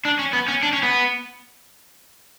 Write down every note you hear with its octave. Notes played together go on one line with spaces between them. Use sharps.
D4
C#4
B3
C#4
D4
C#4
B3